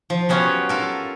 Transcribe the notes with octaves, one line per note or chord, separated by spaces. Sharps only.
F3
F#3 B3 C#4 F4 G4 C#5
F4 A4 A#4